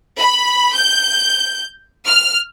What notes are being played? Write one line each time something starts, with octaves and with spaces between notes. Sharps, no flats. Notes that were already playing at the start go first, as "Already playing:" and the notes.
B5
G6
F6